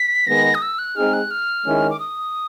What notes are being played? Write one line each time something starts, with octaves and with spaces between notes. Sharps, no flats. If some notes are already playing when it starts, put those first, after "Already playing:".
Already playing: B6
D#3 G#3 B3 A#6
D#6
E6
F#6
G#3 C4 D#4 G#4 F6
F#6
F6
D#3 G#3 C#4 E4
D6
D#6